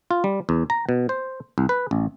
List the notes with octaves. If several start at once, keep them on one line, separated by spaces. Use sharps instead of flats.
F4
G3
E2
A#5
B2
C5
C2
B4
A1